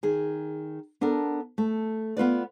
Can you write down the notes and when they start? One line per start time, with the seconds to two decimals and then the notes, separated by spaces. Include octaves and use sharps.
0.03 D#3 G#4
1.01 B3 D4 A4 A#4
1.58 A3
2.17 B3 F4 B4 D5